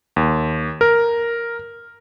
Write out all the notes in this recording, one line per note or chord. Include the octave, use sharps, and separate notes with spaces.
D#2
A#4